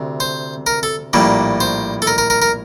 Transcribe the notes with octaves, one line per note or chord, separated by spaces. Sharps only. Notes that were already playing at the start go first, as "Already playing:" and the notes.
Already playing: D2 C3
C5
A#4
A4
A#1 A2 G3 A#3
C5
A4
A#4
A#4
A#4
A#4